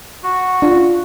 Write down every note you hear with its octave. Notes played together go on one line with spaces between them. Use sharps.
F#4
D4 F4